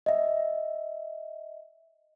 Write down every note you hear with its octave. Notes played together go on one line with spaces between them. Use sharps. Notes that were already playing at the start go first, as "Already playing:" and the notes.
D#5 E5